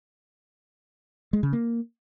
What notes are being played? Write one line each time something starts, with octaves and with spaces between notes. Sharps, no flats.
G#3
C#3
A#3